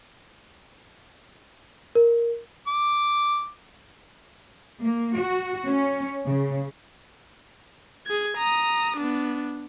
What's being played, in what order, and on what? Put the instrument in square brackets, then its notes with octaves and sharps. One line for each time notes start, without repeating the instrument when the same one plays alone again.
[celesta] A#4
[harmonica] D6
[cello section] A#3
F#4
C#4
C#3
[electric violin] G#4 G#6
A#5 D#6
B3 D4